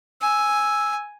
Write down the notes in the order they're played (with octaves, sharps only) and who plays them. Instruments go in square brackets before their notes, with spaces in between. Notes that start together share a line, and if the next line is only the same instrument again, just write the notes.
[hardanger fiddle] G#5 [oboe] E6